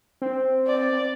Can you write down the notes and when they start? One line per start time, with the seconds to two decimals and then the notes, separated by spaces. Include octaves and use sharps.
0.22 C4
0.67 D5